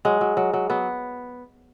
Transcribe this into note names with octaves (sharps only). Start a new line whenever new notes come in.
F#3 G#3
F#3
F#3
F#3
F#3 B3